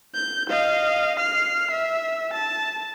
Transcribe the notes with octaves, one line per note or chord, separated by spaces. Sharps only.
G6
D#5 F5
F6 C7
E5
A5